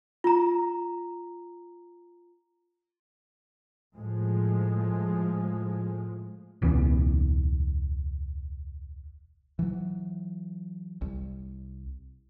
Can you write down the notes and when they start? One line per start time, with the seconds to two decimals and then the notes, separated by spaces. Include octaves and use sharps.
0.24 F4 A#5
3.95 A2 F3 G#3
6.62 E1 C#2 E3 B3
9.59 E3 F#3
11.01 C2